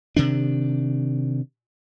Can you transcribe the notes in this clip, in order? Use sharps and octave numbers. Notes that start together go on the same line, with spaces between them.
C3 D#3 D4